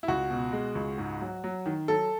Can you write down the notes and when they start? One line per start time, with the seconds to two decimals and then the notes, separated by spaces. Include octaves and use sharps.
0.03 E4
0.08 C#2 F#4
0.30 B2
0.53 G#3
0.75 C#2
0.98 G#2
1.21 F#3
1.44 F#3
1.66 D#3
1.88 F#3 A4